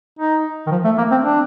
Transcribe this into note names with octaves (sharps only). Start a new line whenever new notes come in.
D#4
D#3
F3
A3
A#3
C4
D4